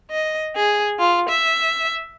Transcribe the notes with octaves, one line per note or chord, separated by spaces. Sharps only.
D#5
G#4
F4
E5